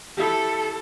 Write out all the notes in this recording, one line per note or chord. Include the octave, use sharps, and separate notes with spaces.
E4 G4 A4